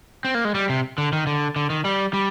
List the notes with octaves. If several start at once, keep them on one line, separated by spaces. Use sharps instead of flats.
C4
A#3
G#3
G3
C3
D3
D#3
D3
D3
D#3
G3
G3